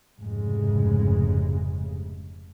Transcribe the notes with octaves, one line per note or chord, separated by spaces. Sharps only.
F1 G#2 C#3 G#3